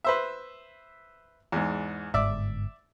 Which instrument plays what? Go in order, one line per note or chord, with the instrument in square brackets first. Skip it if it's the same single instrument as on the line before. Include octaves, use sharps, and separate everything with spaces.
[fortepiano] B4 C5 E5
E2 G#2
[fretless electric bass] G1 G#2 [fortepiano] D5 E5